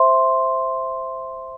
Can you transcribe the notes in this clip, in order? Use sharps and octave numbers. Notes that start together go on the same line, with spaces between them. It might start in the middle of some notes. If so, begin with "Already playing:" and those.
Already playing: C5 E5 C6